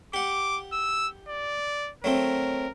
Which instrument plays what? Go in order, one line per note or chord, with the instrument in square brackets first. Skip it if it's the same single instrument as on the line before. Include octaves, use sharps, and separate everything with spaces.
[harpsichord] G4 F#5 [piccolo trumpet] D6
[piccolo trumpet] E6
D5
[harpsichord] F#3 A3 C4 [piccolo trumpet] A#4